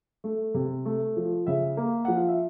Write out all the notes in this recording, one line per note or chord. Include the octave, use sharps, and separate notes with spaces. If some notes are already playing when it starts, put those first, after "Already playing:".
A3
C3
A3
F3
C#3 E5
A#3
F3 F#5
F5
E5